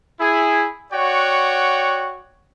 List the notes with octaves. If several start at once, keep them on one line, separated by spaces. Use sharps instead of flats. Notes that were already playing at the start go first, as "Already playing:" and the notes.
E4 G#4
F#4 C#5 D5 F#5 G5